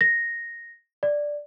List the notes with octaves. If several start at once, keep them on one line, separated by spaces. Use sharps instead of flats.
A#6
D5